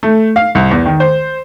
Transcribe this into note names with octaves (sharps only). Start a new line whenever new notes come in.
A3
F5
C2
E2
D#3
C5